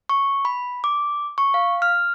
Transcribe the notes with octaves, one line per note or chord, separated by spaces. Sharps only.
C#6
B5
D6
C#6
F5
F6